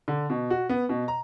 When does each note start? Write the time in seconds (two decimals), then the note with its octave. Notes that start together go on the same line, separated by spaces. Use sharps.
0.08 D3
0.30 B2
0.50 F#4
0.69 B3
0.89 B2
1.08 A#5